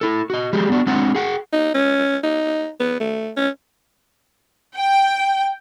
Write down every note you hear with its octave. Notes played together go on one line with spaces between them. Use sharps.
E4 A4
F#4 D#5
F3 F#3 G#3 G4 G#4
B3 D4 F#4
G#3 C4 D4 F4 C#5 F#5
G#4 F#5 G5
D#4
C#4
D#4
B3
A3
C#4
G5